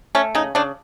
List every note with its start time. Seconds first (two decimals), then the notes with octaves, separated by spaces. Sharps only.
0.15 A3 C#4
0.35 C#3 D#4
0.55 C#3 D4